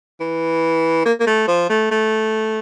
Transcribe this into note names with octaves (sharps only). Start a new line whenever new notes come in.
E3
A#3
A#3
A3
F3
A3
A3